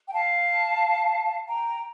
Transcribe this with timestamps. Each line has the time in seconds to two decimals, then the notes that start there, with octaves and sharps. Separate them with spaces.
0.08 G5
0.13 F5 A5
1.47 G5 A#5